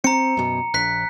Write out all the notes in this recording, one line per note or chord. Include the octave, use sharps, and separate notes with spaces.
C4 A#5 C#7
F#2 B2
A#1 F#6 B6